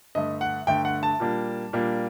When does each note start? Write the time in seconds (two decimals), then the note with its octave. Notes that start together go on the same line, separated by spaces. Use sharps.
0.15 G2 D3 A3 D#5
0.41 F#5
0.67 G2 D3 A3 G5
0.85 F#5
1.03 A5
1.20 A#2 G3 A#3 D4
1.73 A#2 G3 A#3 D4